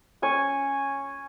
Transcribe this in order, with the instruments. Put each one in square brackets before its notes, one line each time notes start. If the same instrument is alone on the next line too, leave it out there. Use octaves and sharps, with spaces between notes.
[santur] C#4 G#5 C#6